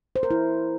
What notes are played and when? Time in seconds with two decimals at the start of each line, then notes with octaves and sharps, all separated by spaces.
0.16 C5
0.23 A#4
0.31 E4